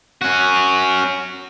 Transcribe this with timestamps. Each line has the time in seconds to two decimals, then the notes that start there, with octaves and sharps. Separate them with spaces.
0.21 C#4 F#4